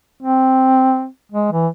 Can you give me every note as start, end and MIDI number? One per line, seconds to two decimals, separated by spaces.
0.23 1.07 60
1.32 1.51 56
1.52 1.67 52